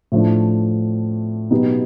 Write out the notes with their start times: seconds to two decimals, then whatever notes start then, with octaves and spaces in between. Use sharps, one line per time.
0.12 A2 F3 A3 D4
1.51 B2 F#3 B3 D#4 G4